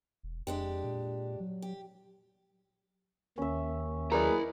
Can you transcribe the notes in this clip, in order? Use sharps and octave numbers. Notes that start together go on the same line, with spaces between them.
E1
F2 G#3 D4 G4
A#2
F#3
G4
D#2 D#3 C#4 E5
F#3 E4 G#4 A#4 B4 D5 D#5 A#5